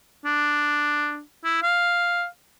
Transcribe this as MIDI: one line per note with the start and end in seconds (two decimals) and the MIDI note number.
0.25 1.21 62
1.44 1.61 64
1.62 2.26 77